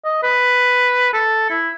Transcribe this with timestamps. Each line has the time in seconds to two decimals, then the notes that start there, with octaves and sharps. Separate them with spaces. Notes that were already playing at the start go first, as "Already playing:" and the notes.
0.05 D#5
0.23 B4
1.13 A4
1.50 E4